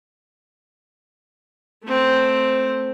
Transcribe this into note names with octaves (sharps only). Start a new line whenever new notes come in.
A3 C4